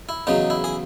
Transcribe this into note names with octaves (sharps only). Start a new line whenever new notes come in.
E4
E2 C#3 F#3 D#4
E4
G#4